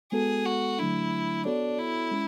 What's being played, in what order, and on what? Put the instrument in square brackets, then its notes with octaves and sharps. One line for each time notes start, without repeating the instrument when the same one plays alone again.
[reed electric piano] G#3 B3 F#4 A4 [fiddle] G#4
[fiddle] F#4
[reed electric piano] D3 F#3 A3 D4 [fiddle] E4
[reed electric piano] B3 F#4 A4 C#5 [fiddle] D4
[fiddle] E4
[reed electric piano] G#3 C#4